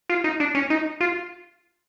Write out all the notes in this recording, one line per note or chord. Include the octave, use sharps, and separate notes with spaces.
F4
D#4
D4
C#4
D#4
F4